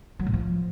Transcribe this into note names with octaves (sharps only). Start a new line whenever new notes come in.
F#3
A2
F3